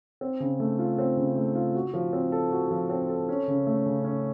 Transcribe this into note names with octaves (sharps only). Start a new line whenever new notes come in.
C4
C#3
A3
F4
C4
C#3
A3
F4
F#4
F3
C4
A4
F#4
F3
C4
A4
C#4
C#3
A3
C#3
C#4